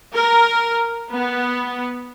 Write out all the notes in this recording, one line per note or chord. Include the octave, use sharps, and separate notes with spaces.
A#4
B3